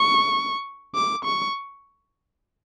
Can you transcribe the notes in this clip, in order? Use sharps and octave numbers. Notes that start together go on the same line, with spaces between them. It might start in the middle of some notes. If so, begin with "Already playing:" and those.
Already playing: C#6
D6
C#6